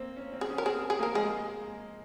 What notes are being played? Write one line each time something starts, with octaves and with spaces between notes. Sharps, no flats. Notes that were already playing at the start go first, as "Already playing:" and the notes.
Already playing: A#3 C4
C#4
C4
G#4
C#4
A#4
C4 G#4
G#4
A#3 A#4
G#3 G#4